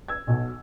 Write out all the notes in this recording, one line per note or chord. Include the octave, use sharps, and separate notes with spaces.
E6 G#6
B1 B2